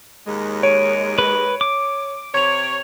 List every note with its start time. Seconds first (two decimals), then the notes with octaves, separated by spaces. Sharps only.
0.27 D#2 G#3
0.63 C#5 D7 D#7
1.18 B4
1.61 D6
2.34 C3 C#5 G#6 F7